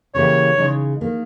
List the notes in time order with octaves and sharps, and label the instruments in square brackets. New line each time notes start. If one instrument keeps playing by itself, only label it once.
[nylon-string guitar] C#3 E3 A#3 E4 G4 [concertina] C#5
[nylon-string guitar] C#3 G#3 D#4
D#3 A#3